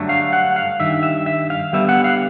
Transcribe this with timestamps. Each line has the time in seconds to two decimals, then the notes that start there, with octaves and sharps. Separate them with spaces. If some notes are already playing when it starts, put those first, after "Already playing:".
Already playing: G2 D3 F#3 A3
0.09 F5
0.33 F#5
0.56 F5
0.80 G2 D#3 E5
1.03 E5
1.26 E5
1.50 F5
1.73 D3 G3 B3 E5
1.89 F#5
2.04 F5